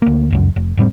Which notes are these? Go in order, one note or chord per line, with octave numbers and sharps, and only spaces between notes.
D2 A#3
F1 C#2 F#2
F1
F1 A2 G3 C4